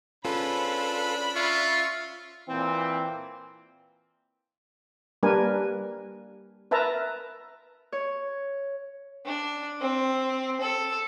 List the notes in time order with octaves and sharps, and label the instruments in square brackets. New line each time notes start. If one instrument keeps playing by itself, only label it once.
[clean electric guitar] C#4 G#4 C5 [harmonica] D4 B5 [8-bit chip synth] F4 A4 B4
[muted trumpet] F4 [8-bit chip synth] E5 C#6
[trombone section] A#2 E3 C4
[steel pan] G3 A#3 D4 A#4 B4 G#5
A#4 B4 E5 A5 A#5
[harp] C#5
[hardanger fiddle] D4
C4
A4